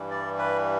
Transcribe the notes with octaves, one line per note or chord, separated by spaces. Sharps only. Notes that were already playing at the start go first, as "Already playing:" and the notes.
Already playing: G2 E3 G3
D5
B4